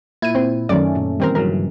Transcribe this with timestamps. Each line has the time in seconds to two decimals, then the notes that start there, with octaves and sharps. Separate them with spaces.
0.22 A#2 E4 G#6 D#7
0.35 C4 C5
0.69 F#2 D#3 F#3 A3 C#4 D5
0.95 A#2
1.20 D#3 E3 G3 C4 A#4
1.35 G2 C#3 F#3 A#4